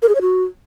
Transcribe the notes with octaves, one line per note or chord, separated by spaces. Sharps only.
A#4
G#4
C#5
F#4